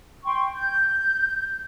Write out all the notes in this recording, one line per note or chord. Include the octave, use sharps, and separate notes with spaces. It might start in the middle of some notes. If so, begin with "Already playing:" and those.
G5 C6 C#6
G6